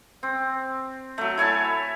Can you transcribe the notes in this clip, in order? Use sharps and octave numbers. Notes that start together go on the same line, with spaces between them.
C4
F#3 A3
E4 C#5 G#5 A5